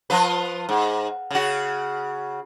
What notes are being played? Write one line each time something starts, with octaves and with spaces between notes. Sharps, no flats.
F3 F4 B4
G#2
C#3 F#4